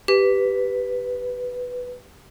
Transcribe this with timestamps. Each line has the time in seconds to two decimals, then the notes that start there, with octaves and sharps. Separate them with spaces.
0.08 G4 B4